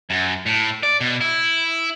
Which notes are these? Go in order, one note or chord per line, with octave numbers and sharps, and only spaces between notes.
F#2
A2
D5
B2
E4